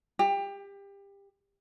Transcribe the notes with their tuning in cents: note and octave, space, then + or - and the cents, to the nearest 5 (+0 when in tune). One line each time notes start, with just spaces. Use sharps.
G4 +25